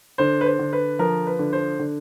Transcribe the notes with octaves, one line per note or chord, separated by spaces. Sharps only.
D3 C5
B4
C5
D3
B4
F3 A#4
B4
D3
C5
D3